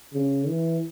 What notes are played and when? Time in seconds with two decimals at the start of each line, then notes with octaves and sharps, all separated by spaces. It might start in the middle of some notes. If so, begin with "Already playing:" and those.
0.13 C#3
0.48 E3